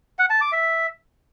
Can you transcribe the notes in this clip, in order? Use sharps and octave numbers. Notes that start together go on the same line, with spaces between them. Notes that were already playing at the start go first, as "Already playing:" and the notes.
F#5
A5
D6
E5